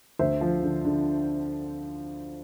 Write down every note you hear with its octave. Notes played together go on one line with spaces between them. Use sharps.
D2 C5 E5
F3
D3
D3